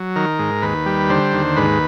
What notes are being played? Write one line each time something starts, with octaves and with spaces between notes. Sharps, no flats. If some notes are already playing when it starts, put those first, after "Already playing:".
Already playing: F#3
D#3 A#4
G#2
D#2 B4
G3
D3 C5
D#2
G#2 B4